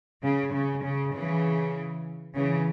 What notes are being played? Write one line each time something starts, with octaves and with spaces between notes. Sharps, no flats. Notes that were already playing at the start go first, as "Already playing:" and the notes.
C#3
C#3
C#3
C#3 E3
C#3 E3